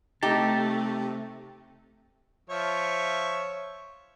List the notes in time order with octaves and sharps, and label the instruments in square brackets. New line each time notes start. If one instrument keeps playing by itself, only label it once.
[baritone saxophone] C3 [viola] A3 [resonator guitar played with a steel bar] D#4 G4 [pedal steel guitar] A5
[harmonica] F3 C#5 E5